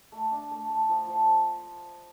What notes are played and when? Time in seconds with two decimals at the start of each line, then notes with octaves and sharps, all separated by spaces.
0.12 A3
0.31 D4
0.51 A3
0.70 A3
0.89 F3
1.07 F3